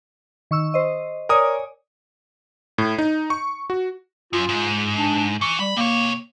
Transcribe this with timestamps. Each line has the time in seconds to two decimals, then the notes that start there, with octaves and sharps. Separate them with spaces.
0.51 D#3 C#6 E6
0.74 C5 D#5
1.29 A#4 C#5 D5 G#5 D#6
2.78 A2
2.99 D#4
3.30 C#6
3.70 F#4
4.33 F#2 F4
4.49 G#2
4.98 D4
5.41 E3 C#6
5.60 G3 B5
5.77 C3 A#3 C#5